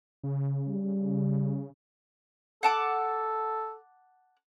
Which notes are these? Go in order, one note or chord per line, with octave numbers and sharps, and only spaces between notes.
C#3
G3
A4 F#5 A5 D6